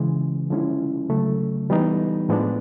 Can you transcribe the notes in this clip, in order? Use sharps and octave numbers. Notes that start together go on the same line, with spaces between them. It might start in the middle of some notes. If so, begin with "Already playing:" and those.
Already playing: C#3 E3 G#3
D3 F3 G#3 C#4 E4
C#3 F#3 A3
E3 G3 B3 D#4
A2 F3 G#3 B3 D4